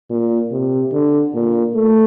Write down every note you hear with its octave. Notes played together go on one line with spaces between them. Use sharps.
A#2
C3
D3
A#2
A3